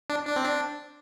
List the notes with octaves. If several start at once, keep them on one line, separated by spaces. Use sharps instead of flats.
D4
D4
C4
D4